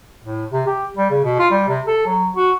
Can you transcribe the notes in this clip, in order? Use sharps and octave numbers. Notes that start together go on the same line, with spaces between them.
A2
C3
G4
G3
C#3
B2
F4
G3
C3
A4
F#3
F#4